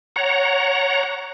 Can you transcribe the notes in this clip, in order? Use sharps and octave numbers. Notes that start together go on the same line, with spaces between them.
C#5 F#5 A#5